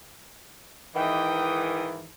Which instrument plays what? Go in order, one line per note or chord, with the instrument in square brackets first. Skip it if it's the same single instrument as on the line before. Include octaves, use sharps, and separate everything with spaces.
[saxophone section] G#2 D#3 E3 [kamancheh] G5 D#6